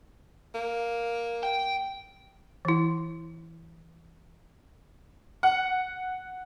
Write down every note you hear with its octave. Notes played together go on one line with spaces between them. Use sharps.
A#3
G5
E3 E4
F#5